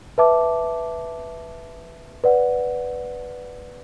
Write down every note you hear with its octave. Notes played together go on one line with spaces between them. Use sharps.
B4 E5 A5 D6
B4 D5 F#5